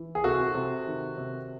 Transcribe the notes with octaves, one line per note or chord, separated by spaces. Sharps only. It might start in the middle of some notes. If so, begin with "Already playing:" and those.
Already playing: E3
G#4
C3 F#4 A4
C3
D#3
C3